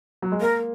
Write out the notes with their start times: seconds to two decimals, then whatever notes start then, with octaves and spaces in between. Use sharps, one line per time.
0.22 F#3
0.32 G#3
0.41 A#3 A#4